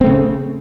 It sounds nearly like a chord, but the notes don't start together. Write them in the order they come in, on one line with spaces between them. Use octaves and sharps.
C4 A3 C#3